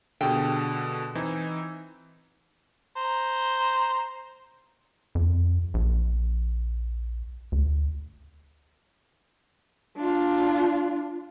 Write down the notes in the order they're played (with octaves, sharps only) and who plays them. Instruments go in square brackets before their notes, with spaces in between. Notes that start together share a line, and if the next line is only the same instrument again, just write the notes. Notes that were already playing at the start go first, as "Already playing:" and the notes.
[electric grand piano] B2 D3 [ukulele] G4 G#4 G5
[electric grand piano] E3 C4 D#4 [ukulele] E4
[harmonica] C5 A#5
[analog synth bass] F2
A#1
D2
[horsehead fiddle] D4 F4